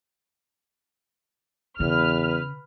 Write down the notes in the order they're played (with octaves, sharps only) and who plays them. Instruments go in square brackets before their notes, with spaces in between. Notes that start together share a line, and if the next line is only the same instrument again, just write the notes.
[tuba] E2 [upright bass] C#3 [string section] B4 F6